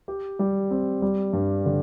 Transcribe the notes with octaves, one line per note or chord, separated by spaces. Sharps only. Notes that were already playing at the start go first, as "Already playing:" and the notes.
G4
G3
C4
G3
G2
D3